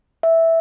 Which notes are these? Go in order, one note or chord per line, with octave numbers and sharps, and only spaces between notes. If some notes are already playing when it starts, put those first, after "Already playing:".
E5